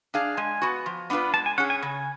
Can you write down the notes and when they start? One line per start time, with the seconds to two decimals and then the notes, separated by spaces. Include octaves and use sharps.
0.14 D4 G#4 D5 F5
0.37 G#3 G#5
0.62 B3 F#4
0.86 F3
1.10 B3 D4 F4 B4
1.34 G#3 A5
1.46 G#5
1.58 C#4 G#4 F#5
1.70 G#5
1.82 C#3 G#5